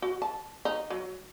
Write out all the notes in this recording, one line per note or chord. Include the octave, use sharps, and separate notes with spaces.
F#4
A5
D#4
F#3